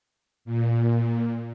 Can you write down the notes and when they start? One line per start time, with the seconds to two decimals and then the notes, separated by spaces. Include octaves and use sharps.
0.45 A#2